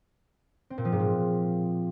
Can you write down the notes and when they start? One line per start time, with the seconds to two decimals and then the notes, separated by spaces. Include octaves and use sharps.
0.70 C4
0.78 A#2
0.85 F3
0.92 G#2
1.00 A#2